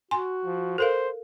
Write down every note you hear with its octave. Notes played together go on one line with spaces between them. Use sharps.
F#4 G#5 C6
F3
A4 A#4 C5 F5